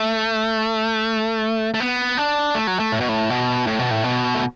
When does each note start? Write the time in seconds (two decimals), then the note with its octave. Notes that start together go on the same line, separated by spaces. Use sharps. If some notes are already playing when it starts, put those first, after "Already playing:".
Already playing: A3
1.74 A3
1.80 B3
2.17 D4
2.55 A3
2.67 F#3
2.80 A3
2.92 A2
3.00 B2
3.09 A2
3.30 B2
3.67 A2
3.79 B2
3.91 A2
4.04 B2
4.34 A3